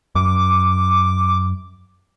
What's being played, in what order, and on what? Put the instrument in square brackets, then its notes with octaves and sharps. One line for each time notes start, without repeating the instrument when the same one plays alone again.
[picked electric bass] F#2 [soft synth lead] D6